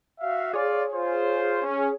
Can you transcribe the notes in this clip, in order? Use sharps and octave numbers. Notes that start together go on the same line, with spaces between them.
F#4 E5 F5
F4 G#4 C#5 D5
F4 C5
C#4